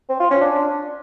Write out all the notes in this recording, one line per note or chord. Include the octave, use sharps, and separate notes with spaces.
C4
F4
C#4
D4